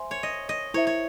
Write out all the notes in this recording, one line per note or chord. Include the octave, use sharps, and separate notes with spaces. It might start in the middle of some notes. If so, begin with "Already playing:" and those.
Already playing: C5 E5 G#5 C6
C#5
D#5
D#5
E4 C5 C#5 E5
C#5